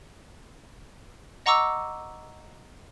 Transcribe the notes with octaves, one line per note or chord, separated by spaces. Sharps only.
D#5 F#5 A#5 C#6 D6 E6